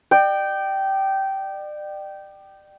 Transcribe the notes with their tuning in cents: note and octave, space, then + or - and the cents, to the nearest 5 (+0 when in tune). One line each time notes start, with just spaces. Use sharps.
D5 +35 G5 -15